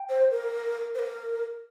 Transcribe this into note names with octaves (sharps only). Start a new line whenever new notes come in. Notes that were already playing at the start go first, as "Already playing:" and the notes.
Already playing: G5
C5
A#4
C5
A#4